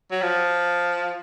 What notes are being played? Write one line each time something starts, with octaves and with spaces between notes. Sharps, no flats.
F#3
F3